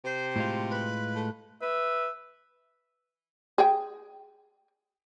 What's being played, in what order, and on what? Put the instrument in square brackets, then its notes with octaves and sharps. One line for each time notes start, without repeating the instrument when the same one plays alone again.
[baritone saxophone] C3 [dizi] C5
[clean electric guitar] A2 G#3 F4
[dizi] B4
[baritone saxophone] A3
[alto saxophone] B4 [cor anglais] E5
[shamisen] G#4 G5